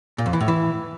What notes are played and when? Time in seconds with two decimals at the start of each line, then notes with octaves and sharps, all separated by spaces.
0.18 A#2
0.26 F2
0.33 E3
0.41 A2
0.48 E3